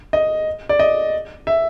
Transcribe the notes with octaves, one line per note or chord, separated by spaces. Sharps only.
D#5
D5
D#5
E5